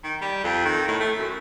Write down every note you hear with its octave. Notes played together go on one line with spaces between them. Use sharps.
D#3
G3
F2
D#3
A2
A3
F#2